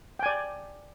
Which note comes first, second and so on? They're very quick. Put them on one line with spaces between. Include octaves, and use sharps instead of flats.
G5 G#5 D5